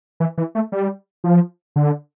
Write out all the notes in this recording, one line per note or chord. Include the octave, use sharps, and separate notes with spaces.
E3
E3
A3
G3
F3
D3